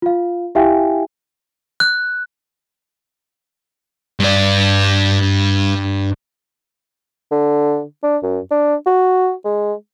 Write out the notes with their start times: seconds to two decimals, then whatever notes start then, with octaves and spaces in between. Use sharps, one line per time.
0.02 F4 F5
0.55 E4 G4 E5 F5 G5 G#5
1.80 F#6
4.20 G2 D5
7.31 D3
8.03 D4
8.23 F#2
8.51 D4
8.86 F#4
9.45 G#3